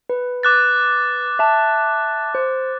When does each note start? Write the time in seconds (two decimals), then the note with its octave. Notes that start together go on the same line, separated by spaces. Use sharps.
0.10 B4
0.43 D6 F#6 A6
1.39 E5 A5
2.35 C5